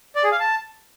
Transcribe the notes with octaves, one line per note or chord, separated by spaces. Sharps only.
D5
G#4
F5
A5